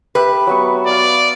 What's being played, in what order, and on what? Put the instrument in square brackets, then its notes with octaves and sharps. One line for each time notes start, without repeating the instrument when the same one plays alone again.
[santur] G4 E5 [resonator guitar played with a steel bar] B4
[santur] F#3 B3 C#6
[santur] B3 F5 [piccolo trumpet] D5